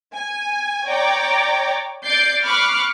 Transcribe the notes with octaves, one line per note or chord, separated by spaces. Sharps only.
G#5
C#5 D5 G5 A#5 D6
D5 G6 A6 C7 D7
B5 C#6 D6 F6 F#6 C7